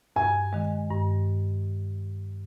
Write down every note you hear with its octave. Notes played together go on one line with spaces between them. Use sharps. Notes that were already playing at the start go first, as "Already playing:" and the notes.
G2 G#5
D#3 G#3
G2